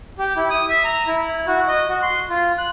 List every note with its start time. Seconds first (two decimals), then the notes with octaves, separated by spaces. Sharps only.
0.18 G4
0.37 E4
0.51 D#6
0.69 E5
0.84 A#5
1.07 E4
1.47 F#4
1.68 D#5
1.89 F#4
2.02 C6
2.29 F4
2.58 F#6